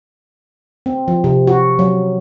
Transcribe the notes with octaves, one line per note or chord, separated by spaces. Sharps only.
C4
F3
C3
F#4
F#3